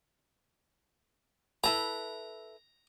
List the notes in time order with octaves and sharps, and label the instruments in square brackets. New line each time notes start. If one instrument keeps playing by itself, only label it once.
[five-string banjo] E4 A4 B4 [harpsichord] A#5